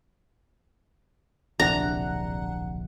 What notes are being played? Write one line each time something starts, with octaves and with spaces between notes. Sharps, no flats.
D1 A#1 C3 D4 F#5 A#5 F#6